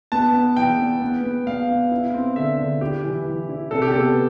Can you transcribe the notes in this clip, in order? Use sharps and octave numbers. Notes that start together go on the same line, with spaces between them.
B3 A5
B3
E3 G5
B3
B3
B3
B3 F5
B3
E4
C4
D3 E5
D3
E4 G4
E3
E3
E4
C3 A4
G4
B3 A4